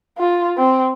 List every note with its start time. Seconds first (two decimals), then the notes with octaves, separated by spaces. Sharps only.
0.18 F4
0.57 C4